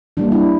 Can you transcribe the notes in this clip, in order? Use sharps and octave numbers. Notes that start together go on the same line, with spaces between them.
E3 G3 A#3 D4
E4